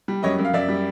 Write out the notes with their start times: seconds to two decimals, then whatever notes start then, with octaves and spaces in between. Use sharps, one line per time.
0.08 G3
0.23 F#2 C#5 D#5
0.38 F#2
0.45 F5
0.53 F#2 D5 E5
0.68 G3